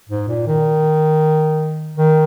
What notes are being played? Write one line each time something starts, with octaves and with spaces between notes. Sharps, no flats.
G#2
A#2
D#3
D#3